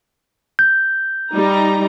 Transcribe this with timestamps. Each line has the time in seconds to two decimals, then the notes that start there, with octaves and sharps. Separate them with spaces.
0.59 G6
1.32 G3 D#4 A#5